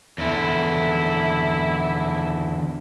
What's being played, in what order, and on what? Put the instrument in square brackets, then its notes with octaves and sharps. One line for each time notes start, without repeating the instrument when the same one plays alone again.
[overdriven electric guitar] E2 D3 [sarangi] E4